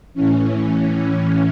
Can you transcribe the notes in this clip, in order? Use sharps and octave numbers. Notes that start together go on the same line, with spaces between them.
A2 E3 C#4